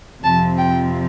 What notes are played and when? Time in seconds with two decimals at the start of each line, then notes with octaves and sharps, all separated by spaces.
0.23 F2 C3 F3 A5
0.58 G5